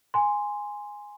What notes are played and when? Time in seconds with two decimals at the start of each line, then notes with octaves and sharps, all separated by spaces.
0.14 G#5 C6